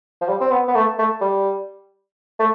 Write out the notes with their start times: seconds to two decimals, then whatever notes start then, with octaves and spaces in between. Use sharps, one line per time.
0.21 F3
0.28 G3
0.41 C4
0.51 B3
0.68 B3
0.75 A3
0.99 A3
1.21 G3
2.39 A3